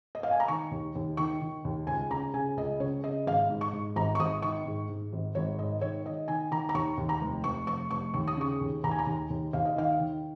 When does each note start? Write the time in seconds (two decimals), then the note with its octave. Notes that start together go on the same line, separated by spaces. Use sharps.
0.15 D#5
0.23 F5
0.31 G#5
0.40 A#5
0.48 D#3 C#6
0.71 D#2
0.95 D#2
1.17 D#3 C#6
1.41 D#3
1.64 D#2
1.87 C#2 G#5
2.10 C#3 A#5
2.34 C#3 G#5
2.57 C#2 D#5
2.80 C#3 C#5
3.04 C#3 D#5
3.26 G#1 F5
3.50 G#2
3.61 C#6
3.73 G#2
3.96 G#1 A#5
4.15 C#6
4.19 G#1 D#6
4.42 D#3 C#6
4.66 G#2
4.89 G#2
5.13 G#1
5.35 G#1 C#5
5.59 G#2 D#5
5.81 D#3 C#5
6.05 D#3 D#5
6.28 D#3 G#5
6.51 D#3 A#5
6.69 A#5
6.74 D#2 C#6
6.97 D#2
7.09 A#5
7.21 F1
7.44 F1 C#6
7.67 F1 C#6
7.91 F1 C#6
8.14 D#2 C#6
8.27 D#6
8.37 C#3 C#6
8.61 D#2
8.84 D#2 A#5
8.91 G#5
8.99 A#5
9.07 D#2
9.30 D#2
9.53 D#2 F5
9.65 D#5
9.76 D#3 F5
10.00 D#3